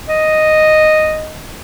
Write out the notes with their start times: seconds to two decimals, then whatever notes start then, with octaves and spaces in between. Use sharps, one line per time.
0.09 D#5